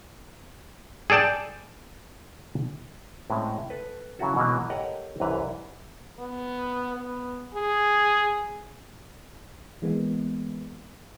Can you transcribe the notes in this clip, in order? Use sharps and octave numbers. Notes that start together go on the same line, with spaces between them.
G#4 A4 D5 G5 A5
A2 G#3 C4 C#4
A4 B4
C#3 F#3 C#4 E4 F#4 A4
B2 E3 F#3 G#3 A#3 B3
G4 A4 A#4 C#5 D#5 F#5
C2 F#2 E3 B4 A#5
B3
B3
G#4
E3 G#3 A#3 B3